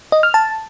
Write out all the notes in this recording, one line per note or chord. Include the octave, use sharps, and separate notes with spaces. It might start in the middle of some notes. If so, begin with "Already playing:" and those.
D#5
F6
A5